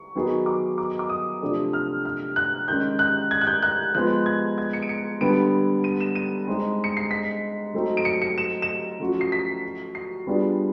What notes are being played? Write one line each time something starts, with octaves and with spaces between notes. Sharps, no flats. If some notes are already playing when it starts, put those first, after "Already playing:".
Already playing: C#6
D#3 F#3 B3 D#4 G#4
D6
D6
D6
D#6
C3 F3 A3 D4
F6
F6
F#6
D#3 G#3 C#4 G6
F#6
G#6
F#6
G6
F#6
F3 G#3 B3 F#6
G#6
G#6
C#7
D7
C#7
D3 G3 B3 D7
D#7
E7
D#7
G#3 C4 D#4
C#7
C7
B6
F#3 A3 C4 D#4
D7
C#7
C#7
E7
E7
F3 A3 C#4 F#4
C7
B6
C7
G3 B3 D4 F4 G#4